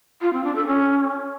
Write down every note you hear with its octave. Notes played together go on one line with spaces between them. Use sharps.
F4
C4
D4
A4
C#4